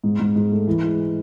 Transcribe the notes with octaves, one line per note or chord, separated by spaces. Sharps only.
G#2
G#2
G#2
A3
E3
G#3